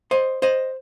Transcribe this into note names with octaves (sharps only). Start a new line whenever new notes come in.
C5 D#5
C5 D#5